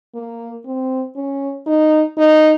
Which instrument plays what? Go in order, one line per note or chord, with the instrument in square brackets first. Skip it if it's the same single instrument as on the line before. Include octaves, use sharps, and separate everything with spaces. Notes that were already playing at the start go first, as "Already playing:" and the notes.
[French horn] A#3
C4
C#4
D#4
D#4